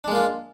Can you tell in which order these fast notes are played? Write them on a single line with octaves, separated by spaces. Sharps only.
D4 G#3 A#3 F4